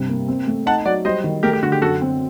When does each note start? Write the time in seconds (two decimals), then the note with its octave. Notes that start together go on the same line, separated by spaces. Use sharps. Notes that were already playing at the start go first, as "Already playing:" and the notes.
Already playing: G2 C3
0.09 A#3
0.28 C4
0.47 A3
0.66 D#4 F#5 A5
0.85 F#3 D5 F#5
1.05 G3 C5 D#5
1.24 D#3
1.43 A3 G4 A#4
1.53 G4
1.63 D3 F#4
1.72 G4
1.82 F#2 F#4 A4
2.01 C4